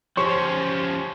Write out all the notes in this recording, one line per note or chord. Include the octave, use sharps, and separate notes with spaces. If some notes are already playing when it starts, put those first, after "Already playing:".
F3 C#4 G4 C5 C#5 C6 C#6